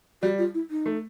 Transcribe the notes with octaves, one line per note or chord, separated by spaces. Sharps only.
G3 F#4
F4
E4
D#4
A3